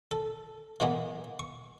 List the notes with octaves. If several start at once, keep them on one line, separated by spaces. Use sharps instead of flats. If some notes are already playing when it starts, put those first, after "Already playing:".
A4
E3 G#3 A#3 B3
C#6